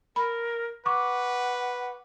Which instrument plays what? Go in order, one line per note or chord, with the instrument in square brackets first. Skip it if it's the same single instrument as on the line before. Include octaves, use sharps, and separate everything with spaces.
[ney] A#4 [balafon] B5
[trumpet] B4 [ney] F#5 [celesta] C#6 D6